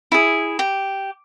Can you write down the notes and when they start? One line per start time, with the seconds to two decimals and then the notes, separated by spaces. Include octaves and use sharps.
0.12 E4 G#4
0.59 G4